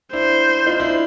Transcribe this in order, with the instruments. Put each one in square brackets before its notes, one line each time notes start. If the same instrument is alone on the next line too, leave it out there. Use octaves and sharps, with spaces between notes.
[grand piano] D4 E4 [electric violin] C5
[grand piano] D#4 F4
D4 E4